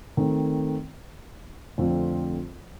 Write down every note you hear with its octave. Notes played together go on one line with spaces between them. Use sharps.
D#3 A3 C4
F2 D3 A3 C4 F4